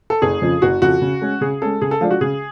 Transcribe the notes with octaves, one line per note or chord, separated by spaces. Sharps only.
A4
F#1 G#4
F2 C#3 F3
F#1 F#4
F2 C#3 F3 F#4
C#3
G#3 C#4
C#3 G#4
G#3 C#4 A4
C#3 G#4
A4
F3 G#3 D4 F4
F#4
C#3 G#4